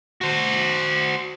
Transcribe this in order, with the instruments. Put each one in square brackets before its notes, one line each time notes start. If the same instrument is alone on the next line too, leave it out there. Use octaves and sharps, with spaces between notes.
[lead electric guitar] F#4 C5